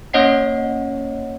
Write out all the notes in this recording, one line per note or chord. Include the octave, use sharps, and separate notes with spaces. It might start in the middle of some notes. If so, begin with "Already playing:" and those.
A#3 C#4 C#5 D#5 F#5 C7